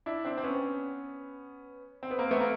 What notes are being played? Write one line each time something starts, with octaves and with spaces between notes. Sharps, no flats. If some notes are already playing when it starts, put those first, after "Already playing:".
D4 E4
C4 D4
C4
B3 C#4
C4
B3
A#3 C4
A3 B3
A#3